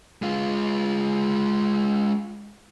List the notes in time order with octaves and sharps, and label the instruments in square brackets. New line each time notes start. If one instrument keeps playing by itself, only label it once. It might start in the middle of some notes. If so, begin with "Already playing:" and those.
[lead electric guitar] G#3 F4